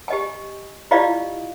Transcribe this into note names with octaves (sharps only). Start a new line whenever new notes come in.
G4 D#5 G#5
E4 F4 G4 D5 D#5 F5